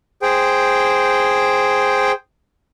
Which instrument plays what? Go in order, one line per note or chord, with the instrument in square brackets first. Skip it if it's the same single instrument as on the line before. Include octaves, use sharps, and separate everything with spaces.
[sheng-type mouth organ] G#4 C5 G5